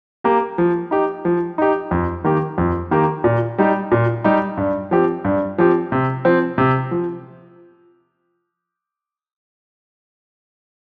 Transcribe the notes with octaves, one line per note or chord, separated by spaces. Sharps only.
A#3 G4
F3
D#4 G4
F3
D#4 G4
F2
D#3 A#3 G4
F2
D#3 A#3 G4
A#2
G3 D#4 G4
A#2
G3 D#4 G4
G2
F3 C4 G4
G2
F3 C4 G4
C3
F3 C4
C3
F3